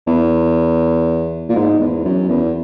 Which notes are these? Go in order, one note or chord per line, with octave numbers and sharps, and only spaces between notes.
E2
A#2
G#2
E2
F#2
E2